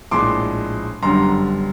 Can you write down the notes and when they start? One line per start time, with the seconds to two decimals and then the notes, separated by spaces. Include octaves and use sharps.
0.11 A#1 A2 F3 G#3 C6 D6
1.03 G1 F#2 D3 G3 A#5 C6